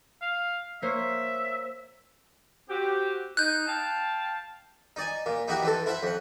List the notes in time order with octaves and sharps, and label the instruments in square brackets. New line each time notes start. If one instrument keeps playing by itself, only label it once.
[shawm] F5
[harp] A#3 C5 C#5 [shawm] E5
[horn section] C4 F#4 G4
[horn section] D#4 [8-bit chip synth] F#6 G6
[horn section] F5 G5 A5
[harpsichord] D#4 D5 G#5
A#2
D#4 E4 F#4 G4
E3 C4 A4
E4 C5 E5 F#5
F2 F#5